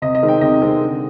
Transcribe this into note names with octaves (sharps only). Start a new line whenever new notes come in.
C3 D#5
D#5
D#3 G#3 C4
G5
C3 D#5
D#3 G#3 C4
D3